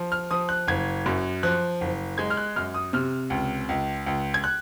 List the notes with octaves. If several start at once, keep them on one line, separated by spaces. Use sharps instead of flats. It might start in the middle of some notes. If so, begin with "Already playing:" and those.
Already playing: F3
F6
F3 D#6
F#6
F#1 G#6
F#2
F3 F#6
F#1
G#3 G#6
F6
F#6
F#2 F6
D#6
C3 F6
C#2
C#2
C#2
G#6
F#6